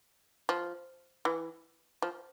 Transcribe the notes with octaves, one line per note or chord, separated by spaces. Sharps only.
F3
E3
F3